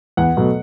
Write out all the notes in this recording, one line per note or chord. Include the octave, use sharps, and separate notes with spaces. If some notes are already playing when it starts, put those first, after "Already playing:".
E2 F#5
B2 F#3 A3